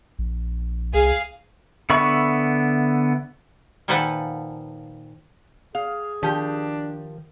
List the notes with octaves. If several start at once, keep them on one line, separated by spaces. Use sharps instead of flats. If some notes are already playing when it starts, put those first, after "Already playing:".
A#1
C2 G#4 F5
D3 B3 E5 B5 C#6
A#2 D#3 F3 A4 B4 F#5
G#4 F5
D#3 F3 D4 G4